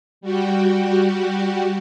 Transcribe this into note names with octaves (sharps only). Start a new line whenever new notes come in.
G3 F#4 G4